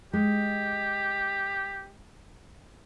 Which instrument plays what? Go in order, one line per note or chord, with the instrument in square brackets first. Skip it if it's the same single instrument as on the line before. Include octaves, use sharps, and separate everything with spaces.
[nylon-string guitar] G#3 [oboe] G4